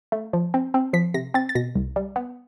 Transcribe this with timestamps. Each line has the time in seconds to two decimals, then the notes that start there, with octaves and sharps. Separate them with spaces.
0.12 A3
0.33 F3
0.54 C4
0.74 C4
0.93 F3 B6
1.14 C3 A#6
1.34 C4 A6
1.49 A6
1.55 B2 A#6
1.75 C2
1.96 G3
2.16 B3